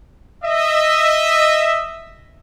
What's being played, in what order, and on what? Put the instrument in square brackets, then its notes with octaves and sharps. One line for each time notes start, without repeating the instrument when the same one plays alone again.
[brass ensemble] D#5 E5